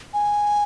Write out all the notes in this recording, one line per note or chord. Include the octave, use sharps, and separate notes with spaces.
G#5